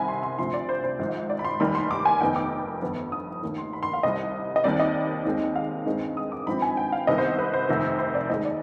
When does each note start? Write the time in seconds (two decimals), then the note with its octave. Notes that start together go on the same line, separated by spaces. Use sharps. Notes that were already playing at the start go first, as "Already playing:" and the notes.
Already playing: C2 C3 D#3 G3 G#5 B5
0.08 C6
0.23 C6
0.38 D2 C3 F3 C6
0.54 D5
0.69 C5
0.84 C5
0.99 G#1 G#2 F3
1.30 D5
1.39 B5
1.45 C6
1.60 F1 D#2 D#3 G3 B5
1.75 C6
1.91 D6
2.05 G#5
2.21 F1 F2 D#3 B3 G5
2.36 D6
2.82 G1 F2 D#3 B3
3.12 D#6
3.43 F1 D#2 D#3
3.58 C6
3.73 B5
3.83 C6
3.93 F5
4.03 C2 C3 G3 D#5
4.56 D#5
4.64 D#2 D#3 G3 C4 D5
4.80 D#5
5.25 D#2 D#3 G#3 C4
5.56 F5
5.86 G2 D#3 G#3 C4
6.17 D#6
6.32 D6
6.47 G#1 G2 F3 C4 B5
6.62 G#5
6.77 G5
6.92 F5
7.07 C2 C3 D#3 B3 D#5
7.18 C5
7.38 B4
7.54 C5
7.69 F1 F2 C3 D#3
7.99 C5
8.14 D5
8.30 D#2 D#3 G#3 D#5
8.45 D5